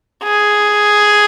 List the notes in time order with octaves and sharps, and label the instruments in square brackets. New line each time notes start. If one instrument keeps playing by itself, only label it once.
[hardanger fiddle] G#4